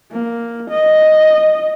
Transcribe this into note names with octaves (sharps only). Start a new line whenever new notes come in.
A#3
D#5